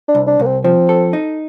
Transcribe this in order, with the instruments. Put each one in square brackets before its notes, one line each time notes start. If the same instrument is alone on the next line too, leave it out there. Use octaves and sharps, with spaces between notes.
[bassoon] D4
[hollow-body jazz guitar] C2
[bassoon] D4
[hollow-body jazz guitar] C2 [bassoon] A#3
[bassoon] C4
[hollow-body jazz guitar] F3 [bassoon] C4
[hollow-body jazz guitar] A4
D#4